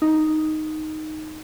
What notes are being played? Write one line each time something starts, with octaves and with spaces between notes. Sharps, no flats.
D#4